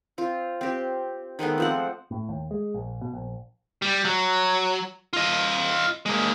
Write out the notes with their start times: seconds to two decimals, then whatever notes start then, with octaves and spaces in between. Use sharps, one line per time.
0.18 C4 F4
0.61 C4 G4
1.39 D#3 G#3 A3 B3
1.58 F3 C4 F#5
2.11 A2
2.29 D#2
2.51 G#3
2.74 A#1
3.01 B2
3.14 A#1
3.82 G3
4.05 F#3
5.13 F4 D#5
6.06 G#3 A#3